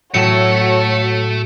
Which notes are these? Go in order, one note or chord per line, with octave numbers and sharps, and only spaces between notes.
A2 F#3 A3 F#4 A4 C#5 C#7